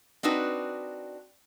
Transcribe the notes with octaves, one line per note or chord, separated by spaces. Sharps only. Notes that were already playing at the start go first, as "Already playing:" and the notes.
C4 D4 D#4 F#4 B4